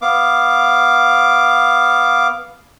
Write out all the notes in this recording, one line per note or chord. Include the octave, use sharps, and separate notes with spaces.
B3 F5 D6